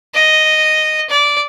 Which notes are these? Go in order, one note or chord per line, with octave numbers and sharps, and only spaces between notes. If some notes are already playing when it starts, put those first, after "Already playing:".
D#5
D5